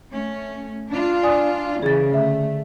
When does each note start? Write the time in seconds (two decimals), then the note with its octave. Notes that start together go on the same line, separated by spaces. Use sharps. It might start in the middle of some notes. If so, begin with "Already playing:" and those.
0.12 A3 C#4
0.91 D4 F4
1.23 D5 G#5 D#6
1.83 C#3 E3 G#4 A6
2.12 D3 A3 E5